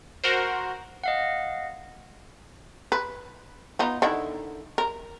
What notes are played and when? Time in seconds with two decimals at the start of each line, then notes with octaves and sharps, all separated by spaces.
0.24 F#4 A#4 C5
1.04 D#5 F5 F#5
2.92 B4
3.79 B3 D#4 F4
4.02 D3 D#3 E4
4.78 A#4